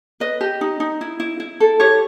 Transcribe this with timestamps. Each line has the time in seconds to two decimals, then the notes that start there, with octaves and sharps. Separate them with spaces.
0.20 B4 D#5
0.41 G4
0.61 D#4
0.80 D#4
1.01 E4
1.20 E4
1.40 E4
1.60 A4
1.80 G4 C#5